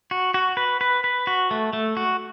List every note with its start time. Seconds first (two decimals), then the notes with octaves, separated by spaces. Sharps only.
0.11 F#4
0.34 F#4
0.57 B4
0.81 B4
1.04 B4
1.27 F#4
1.51 A3
1.73 A3
1.97 F#4